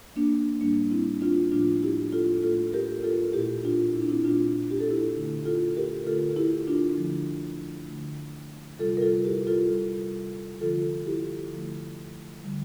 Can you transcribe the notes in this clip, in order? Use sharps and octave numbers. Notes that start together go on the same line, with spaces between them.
A#3 D4
A2 G3 A#3 D4
C4 E4
D4 F4
A2 F3 A3 D4 F4
E4 G4
F4 A4
A2 F3 A3 F4 A4
G4 A#4
F4 A4
A#2 A3 E4 G4
D4 F4
E4
D4
C4 E4
A#2 A3 D4 F4
G4
A4
E4 G4
D3 A3
F4 A4
G4 A#4
D3 A3 F4 A4
E4 G4
D4 F4
D3 F3 A3
D3 F3 A3
C3 G3 F4 A4
A#4
F4 A4
E4 G4
F4 A4
C3 G3
D3 F3 A3 F4 A4
E4 G4
D3 F3 A3
D3 G3